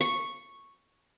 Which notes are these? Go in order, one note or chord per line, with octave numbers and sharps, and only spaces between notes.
C#6